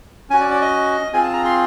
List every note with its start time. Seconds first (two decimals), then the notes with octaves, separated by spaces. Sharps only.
0.30 C#4 F#4 G#5
0.40 D5
0.51 D5
0.62 D#5
1.13 C4 F4 G#4 G#5
1.23 A5
1.33 A#5
1.45 C6